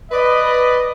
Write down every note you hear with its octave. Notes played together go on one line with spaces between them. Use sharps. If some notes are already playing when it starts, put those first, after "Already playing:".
B4 D5 D#5